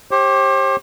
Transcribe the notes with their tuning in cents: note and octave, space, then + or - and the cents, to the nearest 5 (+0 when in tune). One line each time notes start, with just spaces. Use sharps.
G4 +0 C5 +45